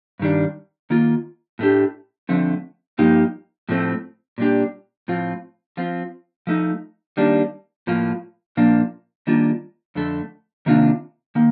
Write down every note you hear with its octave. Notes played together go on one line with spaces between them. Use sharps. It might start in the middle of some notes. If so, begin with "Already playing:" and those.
G2 D#3 G3 D4
D#3 A#3 F4
A2 A3 D4 G4
D3 F3 A3 C4
G2 F3 A#3 D#4 G4
A2 F3 A3 C4
A#2 G3 D4 G4
A2 F3 C4 F4
F3 C4 F4
F3 A3 D#4
D#3 G3 A#3 D4
A2 F3 A#3 F4
A#2 F3 A#3 D4 F4
D#3 G3 A#3 D4 F4
F2 D3 A3
C3 D#3 A#3 D4 F4
D#3 A#3